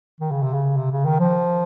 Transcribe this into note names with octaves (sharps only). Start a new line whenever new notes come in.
D#3
C#3
C3
C#3
C3
C#3
D#3
F3